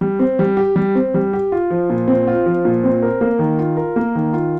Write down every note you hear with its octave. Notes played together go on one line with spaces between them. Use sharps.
G3
C4
G3
G4
G3
C4
G3
G4
F4
F3
A#2
C4
F4
F3
A#2
C4
A#4
A#3
D#3
F4
A#4
A#3
D#3
F4